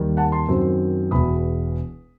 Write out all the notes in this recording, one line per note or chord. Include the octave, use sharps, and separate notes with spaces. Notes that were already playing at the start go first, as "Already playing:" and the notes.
Already playing: D#2 D#3 G3
F#5 A5
A5 C6
F#2 D#3 F#3 C4
E1 E2 B2 B5 D#6